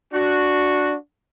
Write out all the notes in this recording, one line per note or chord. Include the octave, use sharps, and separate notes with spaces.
D4 F#4